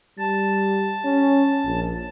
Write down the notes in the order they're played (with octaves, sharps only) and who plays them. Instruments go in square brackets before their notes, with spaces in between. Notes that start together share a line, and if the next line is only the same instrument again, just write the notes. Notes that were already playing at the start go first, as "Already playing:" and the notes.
[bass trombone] G3 [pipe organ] A5
[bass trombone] C#4
A#1